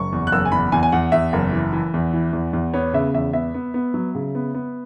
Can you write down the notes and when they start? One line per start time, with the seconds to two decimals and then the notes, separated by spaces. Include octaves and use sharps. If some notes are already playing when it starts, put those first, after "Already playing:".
Already playing: F#1 C#6
0.12 E2
0.27 F#6
0.32 F#1 E6
0.45 G#5
0.52 E2 B5
0.72 E2 G#5
0.83 G#5
0.92 E2 F#5
1.12 E2 E5
1.33 F#1
1.52 E3
1.73 E3
1.94 E2
2.13 E3
2.33 E2
2.53 E2
2.74 B3 C#5
2.93 C#3 E5
3.14 E2 E5
3.33 B3 E5
3.54 B3
3.74 B3
3.94 F#3
4.15 C#3
4.35 B3
4.54 B3